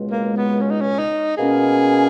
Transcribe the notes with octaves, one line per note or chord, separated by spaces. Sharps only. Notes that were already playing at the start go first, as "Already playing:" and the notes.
Already playing: C#2 B2 G#3
A#3
B3
C#4
D#4
C#4
D#4
B2 A#3 C#4 G#4